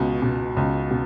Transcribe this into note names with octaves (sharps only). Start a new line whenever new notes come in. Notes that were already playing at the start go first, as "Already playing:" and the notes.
Already playing: C#2 B2
B2
C#2
B2